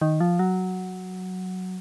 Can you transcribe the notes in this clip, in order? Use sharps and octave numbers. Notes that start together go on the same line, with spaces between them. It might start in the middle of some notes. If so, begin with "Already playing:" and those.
D#3
F3
F#3